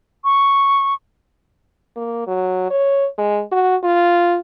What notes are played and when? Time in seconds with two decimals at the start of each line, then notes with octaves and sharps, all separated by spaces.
0.24 C#6
1.96 A#3
2.27 F#3
2.70 C#5
3.18 G#3
3.52 F#4
3.84 F4